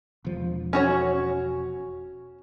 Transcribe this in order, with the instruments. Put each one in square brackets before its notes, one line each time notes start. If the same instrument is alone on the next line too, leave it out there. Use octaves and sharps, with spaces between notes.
[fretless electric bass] E1 F3
[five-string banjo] C#4 F#4 C#5